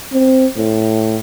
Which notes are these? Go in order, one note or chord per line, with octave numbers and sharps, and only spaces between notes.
C4
A2